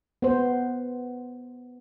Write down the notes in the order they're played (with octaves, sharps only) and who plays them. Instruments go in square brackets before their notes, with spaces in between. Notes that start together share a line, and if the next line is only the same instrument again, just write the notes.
[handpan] B3 C5